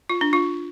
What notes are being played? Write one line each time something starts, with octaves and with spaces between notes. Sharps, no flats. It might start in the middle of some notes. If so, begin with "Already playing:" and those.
F4
D4
F4